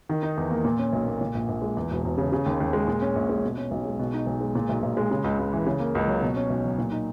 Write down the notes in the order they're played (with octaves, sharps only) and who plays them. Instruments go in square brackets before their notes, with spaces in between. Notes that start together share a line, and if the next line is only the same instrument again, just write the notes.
[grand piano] D#3
D#4
E2
A#3
A#2
C#4
B1
A#3
A#2
A#1
A#1
G#3
E2
E1
E1
C#3
C#3
D#2
D#2
G#3
A#2
C#4
A#1
G#3
B2
C#4
B1
G#3
B2
D#4
B1
G#3
A#2
B1
B1
G#3
C#3
C#2
C#2
E3
C#3
A#3
C#2
F#3
B2
C#4
B1
F#3
A#2
D#4